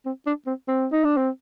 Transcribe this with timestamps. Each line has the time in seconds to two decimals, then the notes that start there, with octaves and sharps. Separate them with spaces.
0.06 C4
0.26 D4
0.47 C4
0.68 C4
0.92 D#4
1.05 D4
1.17 C4